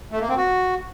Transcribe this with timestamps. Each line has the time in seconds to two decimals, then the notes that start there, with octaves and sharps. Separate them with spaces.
0.12 A3
0.20 A#3
0.29 C4
0.37 F#4